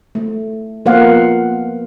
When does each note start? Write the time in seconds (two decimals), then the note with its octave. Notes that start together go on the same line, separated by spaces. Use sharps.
0.15 A3
0.85 F3 A#3 B3 C5 F5 F#5